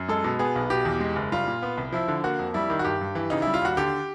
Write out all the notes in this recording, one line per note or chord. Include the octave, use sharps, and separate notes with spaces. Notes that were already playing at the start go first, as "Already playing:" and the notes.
Already playing: F#2
G#3 A4
B2
B3 G#4
B1
B2 G4
E2
G#3
F#1
G3 F4
A#2
B3
C2
F3 E4
D3
A#3 F#4
F2
G3 E4
D#3
F#4
G2 G4
G2
E3
C#3 D#4
G3 E4
F4
D#2 F#4
D3 G4